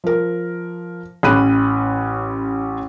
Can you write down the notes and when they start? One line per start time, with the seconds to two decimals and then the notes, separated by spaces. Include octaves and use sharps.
0.04 F3 A#4
1.23 A1 C#4 B5 F#6 D#7